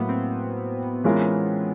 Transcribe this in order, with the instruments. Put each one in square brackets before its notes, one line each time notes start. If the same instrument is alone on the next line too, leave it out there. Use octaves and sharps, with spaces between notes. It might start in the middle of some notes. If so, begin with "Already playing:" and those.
Already playing: [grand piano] A2 F#3 A#3 [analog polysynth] B3
[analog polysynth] C4
[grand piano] E3 G#3 C#4 F4 A#4